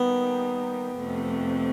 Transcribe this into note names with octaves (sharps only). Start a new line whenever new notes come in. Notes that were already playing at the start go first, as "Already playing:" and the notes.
Already playing: D#3 G3 A#3 B3 D#4 G4
F2 C3 F3 A3